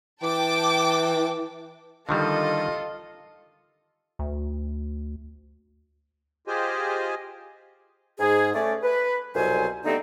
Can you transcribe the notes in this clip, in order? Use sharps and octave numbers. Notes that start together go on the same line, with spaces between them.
E3 G5 A5 D6
D3 D#3 G3 F4 A4 D#5
D2
F4 G4 G#4 C5 D#5 G#5
G#2 G#4
A3 C#4 D5
B4
C2 F2 B2 F#3 C5 G#5
D3 G3 A3 B3 C4 D#4